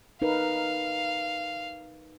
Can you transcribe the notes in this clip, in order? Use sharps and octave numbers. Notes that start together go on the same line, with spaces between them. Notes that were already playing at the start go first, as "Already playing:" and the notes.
D#4 A#4 B4 F5